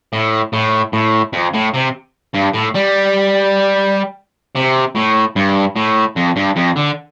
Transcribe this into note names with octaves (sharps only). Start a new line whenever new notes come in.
A2
A2
A2
F2
A2
C3
G2
A2
G3
C3
A2
G2
A2
F2
G2
F2
D3